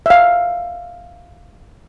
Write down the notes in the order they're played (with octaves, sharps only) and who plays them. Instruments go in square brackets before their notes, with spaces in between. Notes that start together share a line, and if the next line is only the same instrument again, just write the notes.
[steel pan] E5 F5